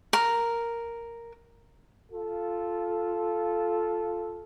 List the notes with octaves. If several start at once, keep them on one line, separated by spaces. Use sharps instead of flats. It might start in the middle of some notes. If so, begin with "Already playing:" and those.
A#4
F4 A4